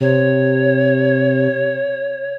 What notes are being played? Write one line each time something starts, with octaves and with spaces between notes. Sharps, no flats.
C3 C#5